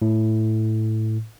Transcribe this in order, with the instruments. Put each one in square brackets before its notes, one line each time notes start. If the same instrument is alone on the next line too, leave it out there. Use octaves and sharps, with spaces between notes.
[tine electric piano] A2